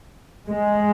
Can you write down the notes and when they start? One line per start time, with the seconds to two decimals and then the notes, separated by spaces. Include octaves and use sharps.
0.47 G#3